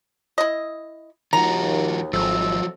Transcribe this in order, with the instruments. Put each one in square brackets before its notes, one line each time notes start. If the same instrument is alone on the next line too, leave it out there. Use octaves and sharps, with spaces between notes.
[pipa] E4 D#5
[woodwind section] D#2 [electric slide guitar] D#3 F3 F#4 [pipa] A#5
[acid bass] G#1 [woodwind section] F2 C3 E6 [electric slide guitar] F3 F#3